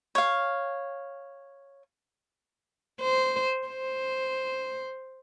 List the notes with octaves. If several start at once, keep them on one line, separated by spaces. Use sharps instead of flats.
C#5 F5
C5
C5